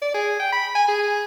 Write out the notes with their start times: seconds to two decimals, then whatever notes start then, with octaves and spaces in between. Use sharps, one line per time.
0.02 D5
0.14 G#4
0.40 G5
0.52 B5
0.75 G#5
0.88 G#4